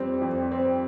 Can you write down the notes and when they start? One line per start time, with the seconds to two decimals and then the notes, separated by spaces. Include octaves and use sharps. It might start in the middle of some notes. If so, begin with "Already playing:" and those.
Already playing: F2 G3 C4
0.22 F2
0.52 C4